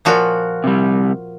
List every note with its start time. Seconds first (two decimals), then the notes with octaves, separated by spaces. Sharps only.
0.05 A#2 F3 F#4
0.64 C3 G3